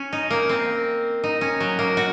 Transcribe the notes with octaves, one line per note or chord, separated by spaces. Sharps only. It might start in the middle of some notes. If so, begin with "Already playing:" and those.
Already playing: C#4
D#4
A#3
C4
D#4
C#4
F#3
A#3
F#4